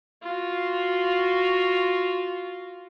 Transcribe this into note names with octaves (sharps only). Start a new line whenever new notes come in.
F4 F#4